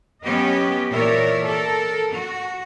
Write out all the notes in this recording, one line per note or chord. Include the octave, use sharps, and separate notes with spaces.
F#3 B3 C#4 G4 B4 D#5
A#2 E3 A#4 C#5 D5 E5
A4 A#4
F#4